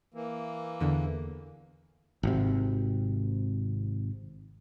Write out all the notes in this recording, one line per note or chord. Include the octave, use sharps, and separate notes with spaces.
E3 A#3
E2 D3
G#1 C3